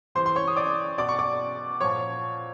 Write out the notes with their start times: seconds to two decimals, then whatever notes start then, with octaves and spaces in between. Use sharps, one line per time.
0.15 C3 E3 C5 C6
0.26 C6
0.36 C#5 C#6
0.48 D#6
0.56 D5 D6
0.98 B2 D5 D6
1.09 C#6
1.19 D5 D6
1.80 A#2 F3 C#5 C#6